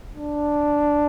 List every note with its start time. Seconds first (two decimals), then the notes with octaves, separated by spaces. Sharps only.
0.15 D4